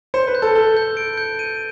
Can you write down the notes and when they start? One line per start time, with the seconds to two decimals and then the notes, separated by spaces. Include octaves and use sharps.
0.14 C5 C#7
0.27 B4
0.35 G6
0.42 A4
0.55 A4 G7
0.77 G6
0.97 D7
1.17 G6
1.39 D#7